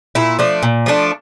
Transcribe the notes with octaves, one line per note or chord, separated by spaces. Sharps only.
A#2 E4
F3 A3 D4
A#2
F3 A3 D4